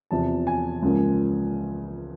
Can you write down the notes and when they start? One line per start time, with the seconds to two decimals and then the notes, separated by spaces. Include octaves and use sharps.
0.11 E2 C3 F3 A5
0.47 G#5
0.82 C#2 C#3 F3 A#3